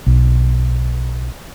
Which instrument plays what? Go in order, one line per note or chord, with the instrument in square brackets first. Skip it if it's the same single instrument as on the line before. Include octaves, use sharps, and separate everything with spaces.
[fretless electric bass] B1